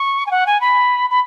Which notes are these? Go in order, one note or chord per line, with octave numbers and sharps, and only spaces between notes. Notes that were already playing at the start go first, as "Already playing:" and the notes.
Already playing: C#6
G#5
F#5
G#5
B5
B5